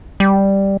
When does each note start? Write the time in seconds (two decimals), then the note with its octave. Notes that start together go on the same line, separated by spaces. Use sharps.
0.20 G3